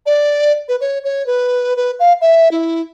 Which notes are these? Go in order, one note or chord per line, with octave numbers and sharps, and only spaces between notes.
D5
B4
C#5
C#5
B4
B4
F5
E5
E4